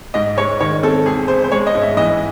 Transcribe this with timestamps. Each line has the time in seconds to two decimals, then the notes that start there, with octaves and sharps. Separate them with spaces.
0.14 G#2 D#5
0.36 G#3 C#5
0.60 D#3 C#5
0.83 C4 A4
1.05 E1 G#4
1.28 E1 C5
1.44 C5
1.52 G#3 C#5
1.67 D#5
1.74 G#2
1.82 E5
1.97 E3 D#5